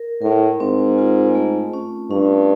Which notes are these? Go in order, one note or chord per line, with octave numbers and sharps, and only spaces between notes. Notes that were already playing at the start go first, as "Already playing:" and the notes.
Already playing: A#4
A2 A#4
G#2 C4
F4
A3
C#4
G2 C#4